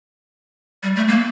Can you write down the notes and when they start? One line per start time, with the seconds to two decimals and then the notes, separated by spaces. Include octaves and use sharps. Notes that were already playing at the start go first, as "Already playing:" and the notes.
0.83 G3
0.96 A3
1.08 A#3